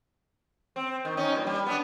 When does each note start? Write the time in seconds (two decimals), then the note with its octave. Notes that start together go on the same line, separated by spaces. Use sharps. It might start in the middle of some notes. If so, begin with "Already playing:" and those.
0.76 C4
1.05 D#3
1.17 C#4 D#4
1.32 G2 A#2
1.47 G3
1.66 B3 D4